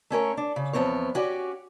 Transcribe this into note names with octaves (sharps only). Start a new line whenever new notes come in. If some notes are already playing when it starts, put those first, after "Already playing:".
A3 C#4 A#4 C#5
D4
C#3
E2 F3 B3 C4 C#5
C#4 F#4 G4 D5